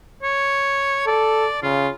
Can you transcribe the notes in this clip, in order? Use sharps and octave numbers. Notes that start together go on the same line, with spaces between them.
C#5
A4 D5
C#3 F4